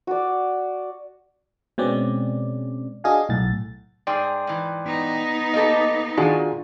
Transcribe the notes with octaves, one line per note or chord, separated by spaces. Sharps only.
F#4 D5
B2 G#3 C4 C#4 D5
D4 F#4 G#4 D#5 F5 G#5
B1 A2 A6
G#2 G#4 D5 G5 C6
G#2 E3
B3 D#4
A#3 G4 A4 D#5
D#3 D4 F4 F#4 G#4 G#5